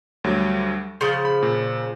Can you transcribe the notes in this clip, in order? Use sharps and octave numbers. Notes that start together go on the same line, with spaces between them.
D2 F#3 G3
C#3 F3 C6
B5
A#2